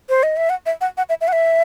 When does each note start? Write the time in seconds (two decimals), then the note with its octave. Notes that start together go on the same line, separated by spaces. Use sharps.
0.09 C5
0.23 D#5
0.37 E5
0.50 F#5
0.66 E5
0.81 F#5
0.97 F#5
1.09 E5
1.21 E5
1.28 F#5
1.33 E5